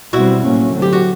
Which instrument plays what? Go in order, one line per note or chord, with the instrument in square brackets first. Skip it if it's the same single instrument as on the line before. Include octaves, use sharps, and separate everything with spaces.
[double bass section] B2 G3 C4 [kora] E4 F#4
[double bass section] A2 F#3 A#3 C#4
D3 F#3 A3 C4
[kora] G4
F#4